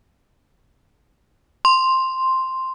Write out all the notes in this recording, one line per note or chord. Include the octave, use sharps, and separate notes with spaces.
C6